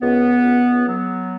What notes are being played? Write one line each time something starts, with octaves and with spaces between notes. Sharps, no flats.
C#2 B3
C#2
F#3 B3